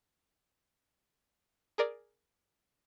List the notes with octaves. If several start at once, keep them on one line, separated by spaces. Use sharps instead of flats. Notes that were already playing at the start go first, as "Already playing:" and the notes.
G#4 A#4 D5